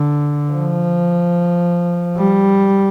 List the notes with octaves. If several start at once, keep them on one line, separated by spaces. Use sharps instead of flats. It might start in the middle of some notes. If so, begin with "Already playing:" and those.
Already playing: D3
F3
G3